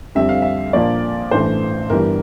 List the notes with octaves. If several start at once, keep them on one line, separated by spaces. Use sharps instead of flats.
F2 D3 G3 C4 E5
F5
E5
A#1 A#2 F3 A#3 D5
A1 G2 E3 A3 C5
G1 G2 E3 G3 A#4